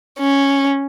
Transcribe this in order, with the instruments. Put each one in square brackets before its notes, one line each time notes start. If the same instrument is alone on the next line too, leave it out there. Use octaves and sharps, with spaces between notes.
[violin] C#4